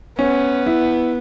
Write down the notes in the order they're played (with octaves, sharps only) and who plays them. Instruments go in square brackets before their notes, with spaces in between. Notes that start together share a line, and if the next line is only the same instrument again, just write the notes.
[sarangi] B3 [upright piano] C#4
[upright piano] E4